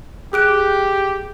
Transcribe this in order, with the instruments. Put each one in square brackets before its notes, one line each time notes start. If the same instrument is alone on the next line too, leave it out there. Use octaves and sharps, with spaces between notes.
[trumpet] G4 [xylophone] G#4 F#6 D7